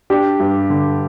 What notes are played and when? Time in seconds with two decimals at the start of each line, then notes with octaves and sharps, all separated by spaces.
0.10 D4 G4
0.40 G2
0.70 D3